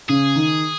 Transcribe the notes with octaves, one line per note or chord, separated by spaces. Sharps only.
C#3 G#4
D#3